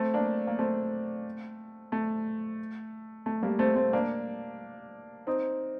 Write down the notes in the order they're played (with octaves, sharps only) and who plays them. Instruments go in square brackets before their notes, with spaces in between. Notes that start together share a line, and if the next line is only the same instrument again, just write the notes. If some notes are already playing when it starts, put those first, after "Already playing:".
Already playing: [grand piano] A3 C4
A#3 D4
A#3
A3 C4
A3
A3
G3 A#3
A3 C4
A3 C4
A#3 D4
C4 D#4